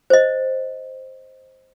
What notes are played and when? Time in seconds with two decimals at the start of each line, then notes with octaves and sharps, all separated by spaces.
0.10 C5 D#5